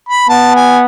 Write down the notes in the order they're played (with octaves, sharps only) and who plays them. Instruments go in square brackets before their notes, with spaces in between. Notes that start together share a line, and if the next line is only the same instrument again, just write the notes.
[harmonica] B5
[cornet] B3 [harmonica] A5
[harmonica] G#5